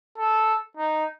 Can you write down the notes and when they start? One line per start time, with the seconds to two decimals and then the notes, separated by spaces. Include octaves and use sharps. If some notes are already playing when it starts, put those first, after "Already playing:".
0.18 A4
0.77 D#4